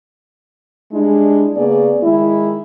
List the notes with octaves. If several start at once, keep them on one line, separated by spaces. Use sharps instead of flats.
G3 G#3 D4 E4
C#3 A#3 B3 G#4 D5
D#3 G#3 E4